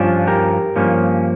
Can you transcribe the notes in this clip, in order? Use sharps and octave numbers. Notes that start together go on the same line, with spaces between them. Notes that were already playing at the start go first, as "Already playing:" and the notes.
Already playing: G2 F3 C#4 D4 F4
G4 A#4
G2 F3 A#3 C#4